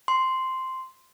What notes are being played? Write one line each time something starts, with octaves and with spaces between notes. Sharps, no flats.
C6